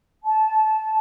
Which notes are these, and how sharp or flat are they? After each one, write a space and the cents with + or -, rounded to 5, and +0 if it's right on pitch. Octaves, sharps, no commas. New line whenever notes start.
A5 -20